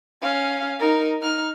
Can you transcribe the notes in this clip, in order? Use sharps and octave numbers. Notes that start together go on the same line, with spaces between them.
C#4 F5
D#4 A#4
D#4 F6